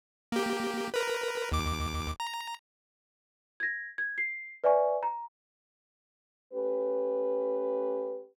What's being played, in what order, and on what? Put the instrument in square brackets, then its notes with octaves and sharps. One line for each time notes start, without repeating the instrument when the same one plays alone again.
[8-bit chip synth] A#3 G4
A#4 B4
D#2 D6
A#5
[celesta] G#6 A#6
G#6
C7
B4 D5 E5 G#5 C#6
A#5
[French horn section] A3 C#4 G4 B4